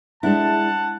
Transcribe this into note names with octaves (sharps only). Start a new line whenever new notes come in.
G#3 D4 E4 F#5 A5